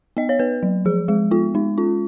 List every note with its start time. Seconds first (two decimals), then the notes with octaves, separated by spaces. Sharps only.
0.17 B3 D#5
0.29 C#5
0.39 B3 B4
0.63 F#3
0.85 F3 G#4
1.08 G#3 G#4
1.31 B3 F4
1.55 G#3 D#4
1.78 C#4 F4